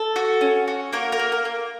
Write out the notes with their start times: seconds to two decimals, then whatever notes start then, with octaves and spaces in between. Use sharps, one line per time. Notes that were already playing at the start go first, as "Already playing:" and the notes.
Already playing: A4
0.16 F#4
0.41 C#4
0.68 F#4
0.93 A#3 A#4
1.12 A#4
1.19 A#3
1.32 A#4
1.45 A#3